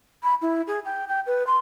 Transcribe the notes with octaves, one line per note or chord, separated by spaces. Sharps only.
B5
E4
G#4
G5
G5
B4
C6